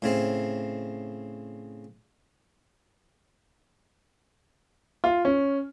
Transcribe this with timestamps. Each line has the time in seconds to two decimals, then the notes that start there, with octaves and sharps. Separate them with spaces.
0.02 A2 C#3 C4
5.04 F4
5.25 C#4